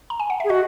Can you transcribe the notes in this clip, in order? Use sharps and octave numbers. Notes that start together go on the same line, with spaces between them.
A#5
G#5
F#5
G#4 E5
F#4 D#5